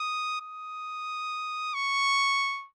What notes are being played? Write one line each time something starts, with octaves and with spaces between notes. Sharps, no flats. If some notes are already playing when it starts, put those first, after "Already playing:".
Already playing: D#6
D#6
C#6